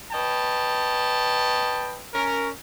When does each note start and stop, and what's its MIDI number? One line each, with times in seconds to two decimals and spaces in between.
0.12 2.00 71
0.12 2.00 73
0.12 2.00 75
0.12 2.00 79
0.12 2.00 81
2.14 2.49 61
2.14 2.49 70